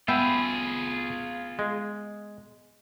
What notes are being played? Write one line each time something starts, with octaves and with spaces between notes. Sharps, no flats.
B3 F4 G#4 E5 G5
G#3